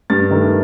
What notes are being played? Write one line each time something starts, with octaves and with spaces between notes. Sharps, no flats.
G2 A6
D#3 A3 D4